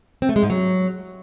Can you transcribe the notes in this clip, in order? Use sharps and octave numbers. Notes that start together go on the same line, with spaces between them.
C4
A3
G#3
G#2
F#3